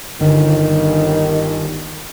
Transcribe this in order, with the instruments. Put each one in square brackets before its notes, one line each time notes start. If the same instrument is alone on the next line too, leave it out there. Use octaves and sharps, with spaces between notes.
[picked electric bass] G1 [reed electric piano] D3 [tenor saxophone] D#3